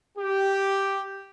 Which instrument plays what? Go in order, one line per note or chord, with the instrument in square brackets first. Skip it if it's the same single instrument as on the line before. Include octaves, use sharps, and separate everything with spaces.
[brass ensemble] G4